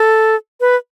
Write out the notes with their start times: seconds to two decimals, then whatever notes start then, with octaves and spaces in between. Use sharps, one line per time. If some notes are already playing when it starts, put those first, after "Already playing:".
Already playing: A4
0.61 B4